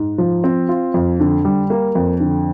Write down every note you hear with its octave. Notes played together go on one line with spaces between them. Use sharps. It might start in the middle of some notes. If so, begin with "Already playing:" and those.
Already playing: G#2
F3
C4
F4
F2
D3
G3
A#3
F2
D3